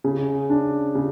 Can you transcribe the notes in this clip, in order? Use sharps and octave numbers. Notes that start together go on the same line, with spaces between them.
C#3
D4
C#3